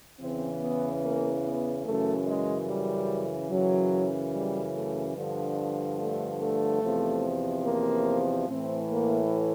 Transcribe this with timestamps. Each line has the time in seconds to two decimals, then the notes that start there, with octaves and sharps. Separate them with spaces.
0.19 E2 C#3 E3 C4
0.61 B3
1.03 A#3
1.43 B3
1.85 F#2 C#3 E3 A3
2.27 G#3
2.68 G3
3.50 F#2 C#3 E3 F#3
4.34 G3
4.75 A3
5.16 G2 D3 F3
5.99 A3
6.40 A3
6.82 E2 C3 F3
7.64 A#3
8.48 A2 E3 C4
8.90 A#3